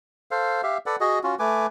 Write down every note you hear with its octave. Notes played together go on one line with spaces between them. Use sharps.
A4 C5 F5
G4 E5 F5
A4 B4 D5 F#5
F#4 G#4 D#5
C#4 F4 F#4
A3 B4 G#5 D6